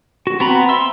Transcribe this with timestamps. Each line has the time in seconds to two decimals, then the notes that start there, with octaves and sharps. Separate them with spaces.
0.27 F#4
0.40 B3 C4 A#5 B5
0.69 E5 C6 E6